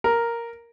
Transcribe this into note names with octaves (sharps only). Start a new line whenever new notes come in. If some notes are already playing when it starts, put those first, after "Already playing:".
A#4